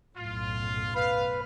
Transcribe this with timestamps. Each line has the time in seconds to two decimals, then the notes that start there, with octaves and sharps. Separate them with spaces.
0.16 B1 F#2 A2 F4
0.95 B4 F5